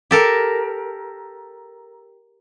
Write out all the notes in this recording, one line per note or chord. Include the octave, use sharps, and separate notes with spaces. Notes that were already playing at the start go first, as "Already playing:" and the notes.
G4 A4 A#4